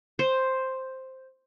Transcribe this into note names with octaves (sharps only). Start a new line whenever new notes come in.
C5